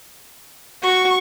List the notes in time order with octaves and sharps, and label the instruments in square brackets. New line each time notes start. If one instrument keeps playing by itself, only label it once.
[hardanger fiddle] F#4 [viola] C#6